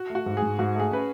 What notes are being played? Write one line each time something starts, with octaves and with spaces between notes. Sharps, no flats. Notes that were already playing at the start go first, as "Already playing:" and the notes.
Already playing: F#4
A3
F#4
G#2
G#4
G#2
G#2 F#4
A3 G#4
C#4 B4